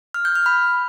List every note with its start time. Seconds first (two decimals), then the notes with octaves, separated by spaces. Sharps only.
0.14 F6
0.25 G6
0.35 F6
0.46 B5